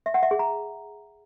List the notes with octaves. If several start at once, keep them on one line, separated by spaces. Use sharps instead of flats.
E5
F#5
E5
G#4
A#5